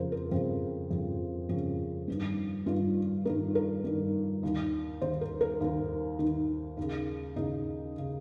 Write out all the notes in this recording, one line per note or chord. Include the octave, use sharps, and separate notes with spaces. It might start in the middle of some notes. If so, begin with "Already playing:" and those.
Already playing: F2 C#3 A#4 C5
A#4
F2 C#3 C4
F2 C#3
F2 C#3 C#4
G2 D#3
G2 D#3 F4
G2 D#3 A#4
A#4
G2 D#3
D#2 D#3
D#2 D#3 C5
A#4
A#4
D#2 D#3
D#2 D#3
D#2 C#3
D#2 C#3 D#4
C#3